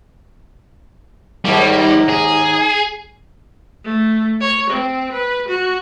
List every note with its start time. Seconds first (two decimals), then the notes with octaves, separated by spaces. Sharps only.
1.45 D#2 G#2 G3 A#3
2.09 G#4
3.85 A3
4.41 C#5
4.70 C4
5.12 B4
5.48 F#4